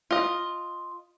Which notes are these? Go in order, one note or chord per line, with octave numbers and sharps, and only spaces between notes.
F4 D#5